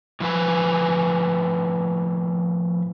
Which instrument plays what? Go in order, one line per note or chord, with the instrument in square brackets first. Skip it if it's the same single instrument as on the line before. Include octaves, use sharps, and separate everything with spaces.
[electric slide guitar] A2 F3 B4 G#5